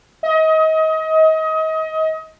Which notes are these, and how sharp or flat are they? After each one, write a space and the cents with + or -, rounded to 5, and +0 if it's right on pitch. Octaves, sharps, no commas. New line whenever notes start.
D#5 +30